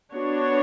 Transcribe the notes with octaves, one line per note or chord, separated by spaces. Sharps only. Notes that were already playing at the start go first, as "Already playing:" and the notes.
B3 D4 F#4 C#5